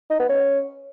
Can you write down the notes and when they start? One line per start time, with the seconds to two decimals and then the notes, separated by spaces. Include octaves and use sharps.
0.10 D#4
0.20 B3
0.29 C#4